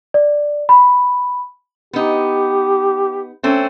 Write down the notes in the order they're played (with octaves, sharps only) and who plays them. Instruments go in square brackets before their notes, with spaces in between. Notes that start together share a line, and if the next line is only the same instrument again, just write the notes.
[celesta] D5
B5
[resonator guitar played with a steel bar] B3 D#4 [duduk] G4
[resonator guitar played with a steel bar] A3 C4 C#4